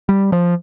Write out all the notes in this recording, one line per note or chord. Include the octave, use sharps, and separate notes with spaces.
G3
F3